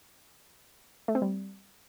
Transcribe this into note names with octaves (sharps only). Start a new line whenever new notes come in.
A3
C4
G3